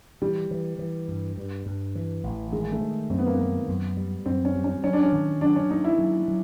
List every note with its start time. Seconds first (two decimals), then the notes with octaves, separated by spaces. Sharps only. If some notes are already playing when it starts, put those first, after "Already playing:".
0.22 E3 G3
0.51 E3
0.79 E3
1.08 G2
1.37 G2
1.66 G2
1.95 E3
2.23 A1
2.52 D#3 G#3
2.72 A3
2.81 D#3
3.10 F#2 C4
3.18 B3
3.26 A#3
3.34 D#3 B3
3.68 F#2
3.97 G3
4.26 F#2 C4
4.45 C#4
4.54 G3
4.64 C#4
4.84 F#3 C#4
4.93 D4
5.03 C#4
5.12 D#3
5.41 F#3 D4
5.56 C#4
5.70 A#3 D#4
5.84 E4
5.98 F#3
6.28 F#3